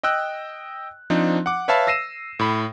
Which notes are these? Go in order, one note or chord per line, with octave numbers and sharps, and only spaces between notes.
D#5 G5 E6 F#6
F3 C4 D4 D#4
F#5 D6
B4 C#5 E5 F5 A5 B5
E6 A#6 C7 D#7 E7
A2 B5